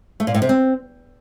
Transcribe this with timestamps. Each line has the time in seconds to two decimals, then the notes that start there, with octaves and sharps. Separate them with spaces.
0.20 A3
0.27 A#2
0.34 A2
0.42 C3
0.49 C4